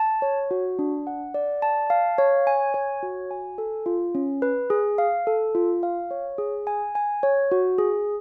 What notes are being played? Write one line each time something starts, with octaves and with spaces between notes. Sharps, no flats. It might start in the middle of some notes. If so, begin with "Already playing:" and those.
Already playing: A5
C#5
F#4
D4
F#5
D5
A5
F5
C#5
G#5
C#5
F#4
G#5
A4
F4
C#4
B4
G#4
F5
A4
F4
F5
C#5
G#4
G#5
G#5
C#5
F#4
G#4